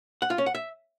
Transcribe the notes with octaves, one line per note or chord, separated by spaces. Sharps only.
F#5
F4
C#4
F#5
E5